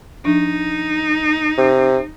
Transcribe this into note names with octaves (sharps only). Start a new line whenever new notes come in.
F3 D4 D#4
C3